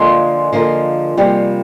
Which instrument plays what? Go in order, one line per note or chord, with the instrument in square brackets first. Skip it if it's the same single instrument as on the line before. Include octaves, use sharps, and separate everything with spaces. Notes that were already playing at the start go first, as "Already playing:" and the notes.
Already playing: [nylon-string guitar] D3 F3 A#3 F4 A#4 [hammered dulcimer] G#3
[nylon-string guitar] D3 F3 A#3 F4 A#4
[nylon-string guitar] C3 F3 A#3 [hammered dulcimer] G3